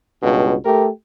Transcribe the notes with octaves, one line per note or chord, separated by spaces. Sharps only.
C#2 G2 B2
A3 G4 A#4